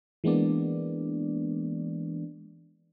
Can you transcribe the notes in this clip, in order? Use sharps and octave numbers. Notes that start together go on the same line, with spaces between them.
E3 G#3 A#3 B3 D4 D5